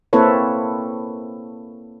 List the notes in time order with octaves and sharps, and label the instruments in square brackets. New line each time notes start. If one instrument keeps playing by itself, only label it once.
[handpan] A#3 C4 E4 A4 B4 C#5